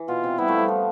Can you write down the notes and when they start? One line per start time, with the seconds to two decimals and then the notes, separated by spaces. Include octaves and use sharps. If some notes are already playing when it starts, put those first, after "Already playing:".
Already playing: E3
0.08 B2 F4
0.23 C3
0.38 G3 B3 E4
0.48 F3 A3
0.59 G3
0.68 F3